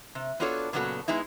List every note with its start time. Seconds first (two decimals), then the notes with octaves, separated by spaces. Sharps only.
0.15 C3
0.40 B3 D4 F4 F#4 A4 C#5
0.73 A#2 C#3 F#3 B3 F#4 A4
1.08 G#3 B3 D#4 E4